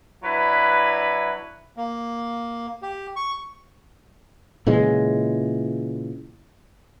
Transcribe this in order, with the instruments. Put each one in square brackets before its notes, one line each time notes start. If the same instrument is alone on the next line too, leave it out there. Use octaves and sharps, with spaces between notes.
[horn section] F#3 D4 E4 B4
[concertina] A#3
G4
C#6
[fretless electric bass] A#2 C#3 E3 G#3